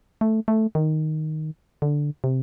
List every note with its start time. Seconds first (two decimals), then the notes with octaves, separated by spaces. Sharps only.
0.21 A3
0.48 A3
0.75 D#3
1.82 D3
2.24 C3